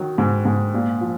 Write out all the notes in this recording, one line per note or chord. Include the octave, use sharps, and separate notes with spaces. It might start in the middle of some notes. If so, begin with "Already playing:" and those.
Already playing: D#3 F#3
G#2
G#2
A#2
F3